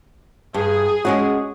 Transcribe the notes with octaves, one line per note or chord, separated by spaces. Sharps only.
G2 G#4
G#3 C#4 F#4